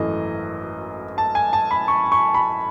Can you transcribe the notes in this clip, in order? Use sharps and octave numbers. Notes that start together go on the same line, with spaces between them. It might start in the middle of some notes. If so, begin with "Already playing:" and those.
Already playing: G#1 F#2 E3 A3 D#5
A5
G#5
A5
B5
C#6
C#6
B5